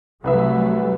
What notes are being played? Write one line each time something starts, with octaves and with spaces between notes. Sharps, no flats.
C2 F#3 G3 A3 B4 E5